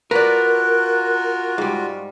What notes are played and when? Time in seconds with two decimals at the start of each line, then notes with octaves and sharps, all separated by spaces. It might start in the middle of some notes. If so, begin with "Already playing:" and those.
0.11 F4 F#4 A#4 B4 D5 F#6
1.58 G#2 G3